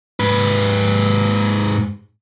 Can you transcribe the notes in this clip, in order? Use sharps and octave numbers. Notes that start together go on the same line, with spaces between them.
G#2 B4